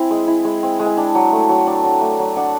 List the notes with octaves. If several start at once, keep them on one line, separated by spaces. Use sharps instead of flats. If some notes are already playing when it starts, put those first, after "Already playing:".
Already playing: C4 E4 G#5
G#3
E4
G#3
C4
G#3
G#5
D4 G5
F#3
A3
F#3
D4
F#3
A3
F#3
D4 F#5